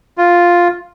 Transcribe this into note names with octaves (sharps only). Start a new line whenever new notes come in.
F4